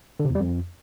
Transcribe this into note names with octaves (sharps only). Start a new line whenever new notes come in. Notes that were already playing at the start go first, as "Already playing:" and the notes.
D3
C3
E2
G3
F2